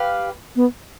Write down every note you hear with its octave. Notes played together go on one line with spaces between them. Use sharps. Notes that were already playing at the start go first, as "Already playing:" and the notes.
Already playing: G4 B4 F5
B3